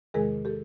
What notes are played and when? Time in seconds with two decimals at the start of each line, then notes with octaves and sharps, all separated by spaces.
0.14 E2 C3 D#3 G#3 G#4 A#4
0.45 G4 A4